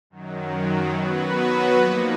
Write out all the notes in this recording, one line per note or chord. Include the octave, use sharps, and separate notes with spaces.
F#2 D#3 F#3
F#3 B3 F#4 B4
F3 A#3 D#4